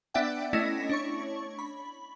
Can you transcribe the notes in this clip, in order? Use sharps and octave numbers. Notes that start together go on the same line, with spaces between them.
B3 D4 D5 E5 F#5 G5
A3 C#4 E4 D#5 A#6 B6
D4 C#5 C#6
B5